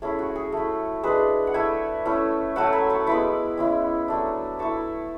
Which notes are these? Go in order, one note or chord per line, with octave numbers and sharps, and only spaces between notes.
A3 C#4 E4 G#4
F#4
G#4
A3 E4
G#3 D4 G#4 B4
F#5
A3 E4 E5 G#5
A3 C#4 E4
F#3 A3 C#4 E4 F#5 A5
G#5 B5
A5 C#6
G#3 B3 E4 B5 D6
G#3 C#4 E4
F#3 A3 D4
A3 E4 A5 C#6